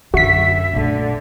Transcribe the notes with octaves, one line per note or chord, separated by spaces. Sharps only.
F#2 D3 F#4 E5 B6
A#1 D3 A3